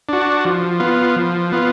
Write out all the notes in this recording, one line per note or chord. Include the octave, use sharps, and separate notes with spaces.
D4 F#4
F3
B3 F4
F3
B3 F4